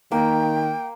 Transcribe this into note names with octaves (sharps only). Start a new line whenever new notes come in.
D#3 A#3 G5